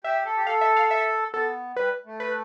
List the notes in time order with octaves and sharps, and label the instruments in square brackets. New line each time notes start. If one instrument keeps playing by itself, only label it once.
[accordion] G4 [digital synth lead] E5
[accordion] A4
G4
[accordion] A4 [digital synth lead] F5
[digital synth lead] E5
F5
E5
[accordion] B3 [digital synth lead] A4
[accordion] G3 [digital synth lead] B4
[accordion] A3
[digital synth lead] B4